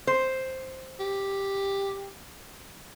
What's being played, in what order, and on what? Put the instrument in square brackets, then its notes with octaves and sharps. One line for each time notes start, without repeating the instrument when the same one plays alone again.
[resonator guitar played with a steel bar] C5
[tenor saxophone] G4